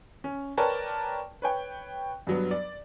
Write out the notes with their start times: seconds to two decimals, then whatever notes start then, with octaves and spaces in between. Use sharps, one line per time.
0.24 C#4
0.58 A#4 B4 C#5 D5 G5 A5
1.42 B4 C#5 G5
2.27 G2 F#3 B3
2.51 D5